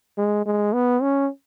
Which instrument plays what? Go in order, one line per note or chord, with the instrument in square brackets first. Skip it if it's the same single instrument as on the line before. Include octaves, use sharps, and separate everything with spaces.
[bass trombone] G#3
G#3
B3
C#4